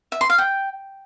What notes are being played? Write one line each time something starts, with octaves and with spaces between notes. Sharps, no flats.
E5
C6
F5
G5